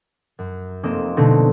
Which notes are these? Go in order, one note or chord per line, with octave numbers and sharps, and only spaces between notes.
F#2
F1 A#3 C4 D#5 E7
B2 D3 A3 C4 D#4 A#4